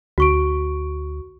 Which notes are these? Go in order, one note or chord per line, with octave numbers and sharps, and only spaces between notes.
D2 F#4 C#6 D7